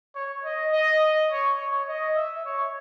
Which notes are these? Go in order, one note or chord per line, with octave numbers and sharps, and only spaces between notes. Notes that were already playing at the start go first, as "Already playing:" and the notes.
C#5
D#5
D#5
C#5
C#5
D#5
E5
C#5